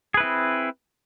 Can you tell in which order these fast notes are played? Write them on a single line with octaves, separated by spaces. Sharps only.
G#4 B4 E4 C4